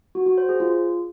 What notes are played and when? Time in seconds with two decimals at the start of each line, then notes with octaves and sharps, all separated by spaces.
0.15 F#4
0.26 F#4
0.38 C5
0.49 G#4
0.60 F4